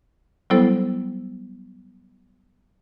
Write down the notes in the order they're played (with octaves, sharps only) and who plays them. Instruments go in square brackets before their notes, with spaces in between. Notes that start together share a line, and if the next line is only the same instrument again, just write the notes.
[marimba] F#3 G3 B3 E4 A4 C5